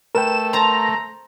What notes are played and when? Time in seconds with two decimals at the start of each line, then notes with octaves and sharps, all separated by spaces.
0.15 A3 A#4 B4 G5 E7
0.53 C5 A5 A#5